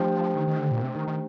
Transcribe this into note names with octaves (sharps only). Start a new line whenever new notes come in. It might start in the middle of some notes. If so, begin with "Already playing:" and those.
Already playing: F3 A3 D4 G4 C5 G5
D#3
D#3
D3
A#2
C3
D#3
D#3